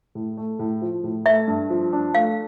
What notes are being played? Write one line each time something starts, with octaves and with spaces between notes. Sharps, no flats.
A2
A3
A2
F3
A2
A3 E5
G2
F3
D4
A3 F5